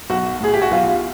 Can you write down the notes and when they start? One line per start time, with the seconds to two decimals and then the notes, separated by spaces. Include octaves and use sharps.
0.10 B1 F#4
0.41 A2 G#4
0.54 G4
0.62 F#4
0.71 B1 F4